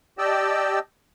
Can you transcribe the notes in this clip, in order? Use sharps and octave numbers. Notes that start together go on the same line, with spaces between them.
G4 D5 D#5 G5 A5 E6